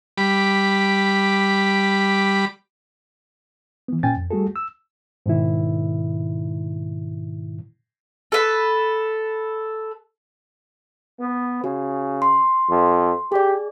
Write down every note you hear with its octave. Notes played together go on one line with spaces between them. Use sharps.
G3 B5 D6
E3 B3
A#2 C#4 G5 G#5 A6
F2
G3 A3 F#4 G#4 A4
E6
G#2 B2 D#3 E4
A4 B4
B3
C#3 F#4
C6
F2
G4 G#4 D5